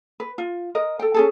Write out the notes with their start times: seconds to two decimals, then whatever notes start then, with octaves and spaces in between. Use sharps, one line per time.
0.20 B4
0.38 F4
0.75 A#4 D#5
0.99 A4 G5
1.14 C#4 G#4 A4